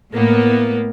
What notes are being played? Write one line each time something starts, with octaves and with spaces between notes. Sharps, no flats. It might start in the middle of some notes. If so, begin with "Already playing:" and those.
A2 A#3 B3